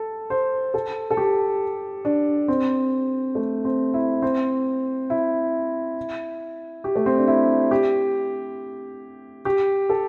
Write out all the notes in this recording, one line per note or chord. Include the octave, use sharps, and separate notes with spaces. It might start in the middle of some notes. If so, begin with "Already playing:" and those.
Already playing: A4
C5
A4
A4
G4
D4
C4
A3
C4
E4
C4
E4
G4
A3
C4
D4
E4
G4
G4
A4